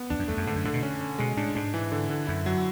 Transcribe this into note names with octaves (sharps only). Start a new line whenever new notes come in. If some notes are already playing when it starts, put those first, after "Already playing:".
Already playing: B3
E2 D4
F#2
E2 A3
F#2
G#2 D3
F#2
G#2 D3
B2
C#4
C#4
B2 G#3
A2 D4
G#2 D4
E3
D3
D3
F#2 E4
F#3